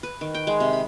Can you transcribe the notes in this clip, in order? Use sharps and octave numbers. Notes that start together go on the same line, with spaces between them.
B4
D#3
G5
G#3
C3
B5